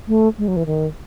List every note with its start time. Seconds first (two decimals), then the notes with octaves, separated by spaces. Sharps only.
0.08 A3
0.38 G#3
0.48 F#3
0.56 E3
0.66 D#3